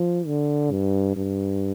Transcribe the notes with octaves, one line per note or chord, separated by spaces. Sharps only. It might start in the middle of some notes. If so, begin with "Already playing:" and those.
Already playing: F3
D3
G2
G2